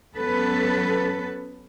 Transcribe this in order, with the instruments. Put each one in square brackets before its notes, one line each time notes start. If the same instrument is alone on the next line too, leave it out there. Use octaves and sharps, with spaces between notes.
[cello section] F#3 B3 C#4 A4 B4